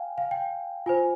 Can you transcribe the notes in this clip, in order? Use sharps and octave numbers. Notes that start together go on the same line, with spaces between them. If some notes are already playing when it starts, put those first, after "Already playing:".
Already playing: F5 G5 G#5
F5
G5
F4 C5 G#5